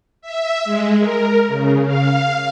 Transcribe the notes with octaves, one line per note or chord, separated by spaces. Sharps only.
E5
G#3
A#4
C#3
F5